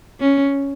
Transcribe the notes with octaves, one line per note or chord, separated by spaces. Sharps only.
C#4